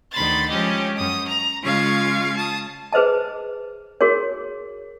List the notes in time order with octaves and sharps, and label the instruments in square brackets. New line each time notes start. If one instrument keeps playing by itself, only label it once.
[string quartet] D2 D#3 B5 C6 A6
F3 G#3 C#4 G4 D#5
F#2 D#6
A#5
C#3 G#3 F4 F5 C#6 G#6
A5 D#6
[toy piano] G#4 B4 C5 D#5 A5
F#4 G#4 A#4 C#5